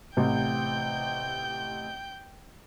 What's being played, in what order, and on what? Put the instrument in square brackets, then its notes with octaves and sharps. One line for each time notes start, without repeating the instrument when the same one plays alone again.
[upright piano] A1 C3 [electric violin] G5 G6